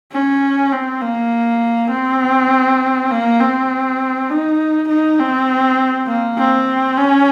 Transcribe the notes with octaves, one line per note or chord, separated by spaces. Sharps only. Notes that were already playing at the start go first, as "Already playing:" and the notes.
C#4
C4
A#3
C4
A#3
C4
D#4
D#4
C4
A#3
C4
C#4